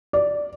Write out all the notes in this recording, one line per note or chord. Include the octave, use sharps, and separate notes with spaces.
D5